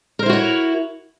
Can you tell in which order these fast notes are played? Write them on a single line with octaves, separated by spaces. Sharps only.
A#4 C5 E4 F#4 C#5